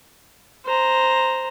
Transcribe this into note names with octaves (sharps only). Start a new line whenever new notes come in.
C5 A#5